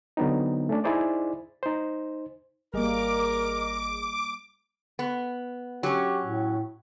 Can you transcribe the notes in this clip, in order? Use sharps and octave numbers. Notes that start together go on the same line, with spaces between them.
D3 F#3 B3 C4 D#4
A3 C#4 D4
D#4 E4 G#4 C5 D5
D#4 C5
G#1 G3 A#3 G#4 A#4 D#5 D6
B3
F#3 C#4 G4
A2